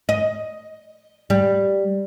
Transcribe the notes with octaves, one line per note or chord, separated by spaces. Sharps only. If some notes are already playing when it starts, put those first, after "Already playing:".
D#5
G3